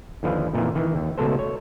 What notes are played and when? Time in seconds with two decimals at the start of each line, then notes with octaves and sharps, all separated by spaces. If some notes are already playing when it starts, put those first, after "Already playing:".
0.23 D#2 D3 F3 B4
0.53 F2 A#2 D#3 E3
0.75 D#3 E3
0.95 D#2
1.18 C#2 B2 A3 A4 C5
1.39 C#5